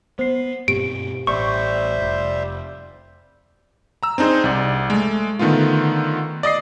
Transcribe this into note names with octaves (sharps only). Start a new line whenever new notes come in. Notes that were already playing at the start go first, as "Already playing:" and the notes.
B3 C5 C7
G2 B2 C4 G4 D7
A1 G3 C5 E5 C#6
F1
A#5 E6
C4 D4 D#4 G#4 C5
C2 D5
G#3 A3
D3 D#3 A3 B3 F4
D5 D#5 D#6 C7